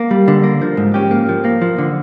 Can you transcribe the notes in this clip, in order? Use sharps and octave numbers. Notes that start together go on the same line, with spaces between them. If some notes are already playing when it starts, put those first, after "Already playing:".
Already playing: A#3
G3
D3
A#3
F3
G#2
C#4 G4
A#3
F3
A#3
F3
D3